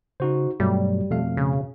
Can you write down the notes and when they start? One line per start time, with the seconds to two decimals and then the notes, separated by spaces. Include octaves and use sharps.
0.20 C#3 D#4 F#4 C5
0.60 G2 B2 F#3 G3 A3
1.11 F2 B2 A3 F5
1.37 C#3